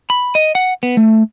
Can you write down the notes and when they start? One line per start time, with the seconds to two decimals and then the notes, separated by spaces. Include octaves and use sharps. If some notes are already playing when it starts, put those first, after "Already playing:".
0.10 B5
0.35 D#5
0.55 F#5
0.83 B3
0.97 A3